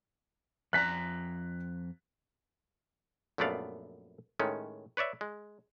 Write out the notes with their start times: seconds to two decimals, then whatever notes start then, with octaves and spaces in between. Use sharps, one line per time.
0.73 F2 A5 A#5 F#6 B6
3.38 A#1 F#2 A3 B3 D5 F5
4.39 A2 D#3 G#3 C#4
4.97 B4 C#5 D5 E5
5.21 G#3